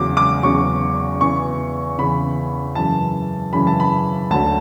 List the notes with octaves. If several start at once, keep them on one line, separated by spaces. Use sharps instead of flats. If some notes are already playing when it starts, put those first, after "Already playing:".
Already playing: E2 C#3 F#3 D6
D6
E2 C#3 F#3 C#6
E2 C#3 E3 C#6
E2 C#3 E3 B5
F#2 C#3 E3 A5
F#2 C#3 E3 B5
A5
B5
D2 D3 F#3 A5